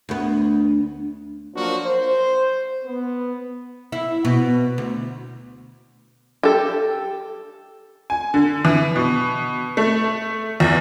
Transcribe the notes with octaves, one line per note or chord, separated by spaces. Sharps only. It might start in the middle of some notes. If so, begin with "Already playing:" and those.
D2 B3
F3 F#3 A#3 D4 F#4
C5
B3
E4
B2
D2
G4 A4
G#5
D3
E3
B2
A3
E2